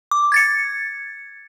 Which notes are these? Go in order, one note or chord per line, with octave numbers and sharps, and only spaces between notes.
D6
G#6 A6 C#7